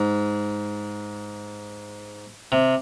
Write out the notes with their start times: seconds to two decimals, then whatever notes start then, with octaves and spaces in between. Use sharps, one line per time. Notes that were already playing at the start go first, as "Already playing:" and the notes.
Already playing: G#2
2.52 C3